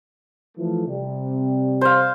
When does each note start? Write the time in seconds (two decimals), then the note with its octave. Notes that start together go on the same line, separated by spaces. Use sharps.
0.57 E3 F3 A3
0.87 C3 G3
1.81 C5 F5